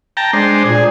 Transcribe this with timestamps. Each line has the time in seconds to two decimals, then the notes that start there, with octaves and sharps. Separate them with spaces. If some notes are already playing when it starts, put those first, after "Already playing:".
0.17 G5 A5 A#5
0.33 G#3 D4 C5
0.65 A#2 G#4